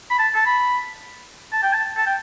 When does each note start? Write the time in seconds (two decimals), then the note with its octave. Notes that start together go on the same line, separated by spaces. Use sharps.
0.10 B5
0.19 A5
0.35 A5
0.46 B5
1.53 A5
1.63 G5
1.73 A5
1.97 A5
2.06 G5